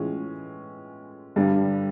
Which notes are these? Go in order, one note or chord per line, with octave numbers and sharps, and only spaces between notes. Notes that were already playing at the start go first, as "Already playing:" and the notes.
Already playing: A2 E3 G#3 C#4 F4
G2 D3 G3